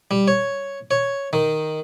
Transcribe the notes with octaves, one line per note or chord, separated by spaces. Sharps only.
G3
C#5
C#5
D#3